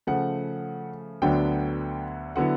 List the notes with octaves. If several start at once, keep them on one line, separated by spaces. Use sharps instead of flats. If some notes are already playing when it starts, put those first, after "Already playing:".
C#3 F3 A3 F#5
D2 D3 F#3 B3 D4 G5
D3 F#3 B3 E4 F#5